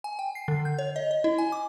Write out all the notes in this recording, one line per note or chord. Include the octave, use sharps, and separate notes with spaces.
G#5
G5
C7
D3
G6
C#5
D#5
D#5
E4
G#5
D6